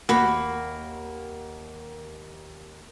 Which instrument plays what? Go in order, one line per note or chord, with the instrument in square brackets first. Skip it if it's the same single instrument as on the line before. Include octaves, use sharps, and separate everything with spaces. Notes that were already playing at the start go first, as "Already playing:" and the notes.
[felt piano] D#2 [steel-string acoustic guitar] A#3 [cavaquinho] F#4 B5